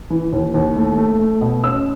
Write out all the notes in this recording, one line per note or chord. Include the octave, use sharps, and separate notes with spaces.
E3
D#2
D#2
A3
A3
A3
B2
C#4 E6